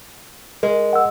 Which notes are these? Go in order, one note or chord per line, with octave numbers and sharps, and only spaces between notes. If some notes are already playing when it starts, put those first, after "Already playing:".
G#3 A#4
F#5 E6